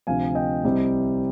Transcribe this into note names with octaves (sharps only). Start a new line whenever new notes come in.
D2 C3 F3 F5 G#5
D#5 G5
C2 C3 G3 C4